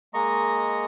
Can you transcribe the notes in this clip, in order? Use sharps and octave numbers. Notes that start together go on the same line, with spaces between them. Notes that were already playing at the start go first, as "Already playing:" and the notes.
G#3 A#3 D#5 A#5 C#6